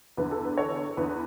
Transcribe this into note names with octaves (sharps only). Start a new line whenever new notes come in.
E2 D3 B4
A4
B4
A4 C#5
E2 D3 B4